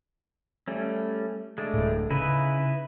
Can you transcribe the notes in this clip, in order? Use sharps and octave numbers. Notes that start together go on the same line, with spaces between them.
G3 A3 C#4
G#3 A3 D4
D1 A2
C#3 D#4 E4 B4